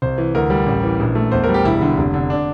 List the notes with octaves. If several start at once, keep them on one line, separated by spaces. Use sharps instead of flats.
C2 C5
E3
D2 A#4
G3
A1
E3
A#1
A3
E2 C5
G3 A#4
G4
E1 E4
D3
F1
D3
D4